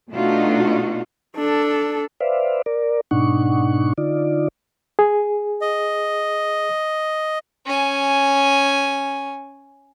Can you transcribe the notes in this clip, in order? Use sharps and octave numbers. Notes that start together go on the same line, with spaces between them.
B2 A3 D4 D#4 F4 F#4
D4 A4
B4 C5 D5 E5 F5
A#4 D5
G#2 B2 D4 D#4 F#5 C#6
D3 D#4 F4 D5
G#4
D#5
C#4 G#5